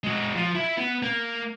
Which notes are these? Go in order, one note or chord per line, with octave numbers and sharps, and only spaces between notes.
G#3 F#4
F3
E4
B3
A#3